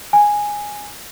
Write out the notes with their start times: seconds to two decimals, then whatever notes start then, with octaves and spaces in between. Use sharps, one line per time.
0.13 G#5